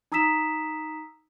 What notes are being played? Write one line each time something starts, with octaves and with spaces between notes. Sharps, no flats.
D#4 A#5 D#6 E6 B6 E7